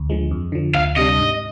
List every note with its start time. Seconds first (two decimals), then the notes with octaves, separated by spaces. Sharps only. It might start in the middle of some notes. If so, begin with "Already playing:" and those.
Already playing: D2
0.10 D3 F3 G#3
0.31 F2
0.52 D3 F3
0.75 D2 F5
0.96 C3 G3 D4 D#5
1.19 G#2